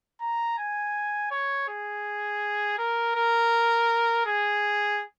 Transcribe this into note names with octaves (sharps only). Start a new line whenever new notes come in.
A#5
G#5
C#5
G#4
A#4
A#4
G#4